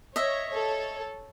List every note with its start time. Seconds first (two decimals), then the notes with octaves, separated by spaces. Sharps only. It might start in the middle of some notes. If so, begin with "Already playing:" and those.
0.16 C#5 D#5 E5
0.51 A4 C#5